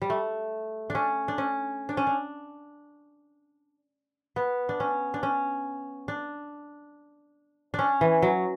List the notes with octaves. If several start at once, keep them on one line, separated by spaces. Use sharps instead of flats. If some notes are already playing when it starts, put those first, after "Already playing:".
G3
A3
D4
C#4
D4
C#4
D4
C#4
D4
B3
D4
C#4
D4
C#4
D4
C#4 D4
E3
F#3